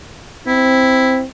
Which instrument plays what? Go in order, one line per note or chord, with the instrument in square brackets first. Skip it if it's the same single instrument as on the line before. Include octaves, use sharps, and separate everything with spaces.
[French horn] C4 [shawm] E4